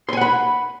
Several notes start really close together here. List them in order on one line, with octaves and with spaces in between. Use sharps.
C6 G#5 F#5 B5